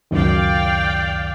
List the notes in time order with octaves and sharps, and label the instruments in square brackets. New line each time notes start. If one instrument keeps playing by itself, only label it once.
[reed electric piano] C#2 F#2 D#3 [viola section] D5 F5 G5